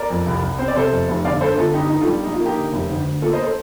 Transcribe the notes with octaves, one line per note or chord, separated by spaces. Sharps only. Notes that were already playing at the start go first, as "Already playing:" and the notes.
Already playing: A#4 D5
F2
C2
C2
C4 C5
D5
C3 A4 C5
F2
F1
G1 D5 F5
G2 A4 C5
G1 F4 A4
G2 D#4 G4
D#3 D#4
F4 A4
G3
A#1 D#4
F4
A#3
D#4 G4
D3
F1
D2
D2
A#3 F4 A4
C5 D#5
A4 C5